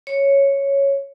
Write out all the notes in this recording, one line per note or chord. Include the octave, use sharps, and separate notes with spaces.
C#5